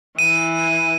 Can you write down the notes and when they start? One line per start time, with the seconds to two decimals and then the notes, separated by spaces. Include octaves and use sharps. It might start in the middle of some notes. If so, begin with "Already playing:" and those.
0.19 E3 D#7